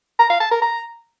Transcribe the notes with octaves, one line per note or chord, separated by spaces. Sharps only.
A#5
F5
A5
A#4
A#5